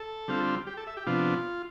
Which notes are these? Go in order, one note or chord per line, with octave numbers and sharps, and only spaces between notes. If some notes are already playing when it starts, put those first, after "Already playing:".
Already playing: A4
D3 G3 C4 F4
G4
A4
E5
G4
C3 F3 B3 D4 F4